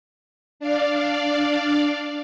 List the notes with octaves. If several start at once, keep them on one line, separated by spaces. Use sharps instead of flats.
D4 D5 F5